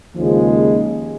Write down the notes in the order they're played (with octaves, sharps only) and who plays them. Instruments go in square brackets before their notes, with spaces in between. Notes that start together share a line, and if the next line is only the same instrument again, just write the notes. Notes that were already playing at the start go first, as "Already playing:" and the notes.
[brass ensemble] D#2 C#3 G#3 [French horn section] F3